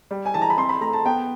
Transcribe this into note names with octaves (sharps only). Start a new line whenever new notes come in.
G3
G#5
E3 A5
A#5
B5
C4 C6
B5
A3 A#5
A5
B3 G5